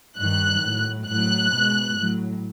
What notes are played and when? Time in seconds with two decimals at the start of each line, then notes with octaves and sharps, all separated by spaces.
0.19 G2 D#3 G3 F#6
0.63 A2 F#3
1.08 A2 F#3 F#6
1.53 B2 G#3
1.98 A2 F#3